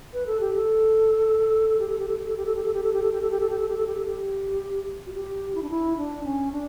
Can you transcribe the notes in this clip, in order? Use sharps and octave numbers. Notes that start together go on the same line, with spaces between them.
B4
A4
G4
A4
G4
A4
G4
A4
G4
A4
G4
A4
G4
A4
G4
A4
G4
A4
G4
A4
G4
A4
G4
A4
G4
A4
G4
A4
G4
F#4
G4
E4
D4
E4
D4
C#4
D4